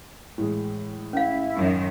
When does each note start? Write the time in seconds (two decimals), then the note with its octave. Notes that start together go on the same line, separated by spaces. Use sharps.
0.38 A2 E3 G#3
1.13 C#4 E4 E5 F5
1.55 F#2 D#3